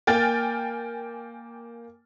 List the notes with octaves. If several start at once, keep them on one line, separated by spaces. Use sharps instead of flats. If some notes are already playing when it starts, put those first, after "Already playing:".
A#3 G5 G#5 F6 A6